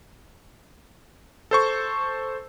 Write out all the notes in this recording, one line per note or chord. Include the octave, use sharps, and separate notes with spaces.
A4 C5 C#6